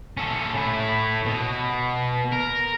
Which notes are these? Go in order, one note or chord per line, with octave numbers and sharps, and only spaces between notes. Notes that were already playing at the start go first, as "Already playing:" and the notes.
C#4 A4
A2 E4
B2
A#4